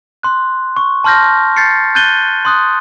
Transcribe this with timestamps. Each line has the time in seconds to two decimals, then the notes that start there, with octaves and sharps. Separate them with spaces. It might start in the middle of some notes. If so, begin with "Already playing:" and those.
0.23 C6 F#6
0.77 C#6
1.04 A5 C6 F6 G6 A#6
1.56 G6 A6 C7 C#7
1.95 F#6 G6 A6 D#7 G7
2.45 C6 D#6 F#6